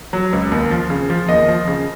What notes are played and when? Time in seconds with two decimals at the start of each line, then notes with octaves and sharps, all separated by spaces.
0.13 F#3
0.33 C#2
0.51 D#2
0.71 F3
0.90 C#3
1.10 F3
1.29 D#2 D#5
1.48 F3
1.67 C#3